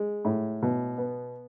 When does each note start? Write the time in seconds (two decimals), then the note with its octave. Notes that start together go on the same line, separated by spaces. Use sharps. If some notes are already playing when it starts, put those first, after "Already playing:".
Already playing: G#3
0.25 A2
0.62 B2
0.98 B3